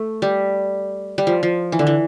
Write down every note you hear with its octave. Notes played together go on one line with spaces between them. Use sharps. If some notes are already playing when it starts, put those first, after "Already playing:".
Already playing: A3
G3
G3
F3
F3
E3
D3
E3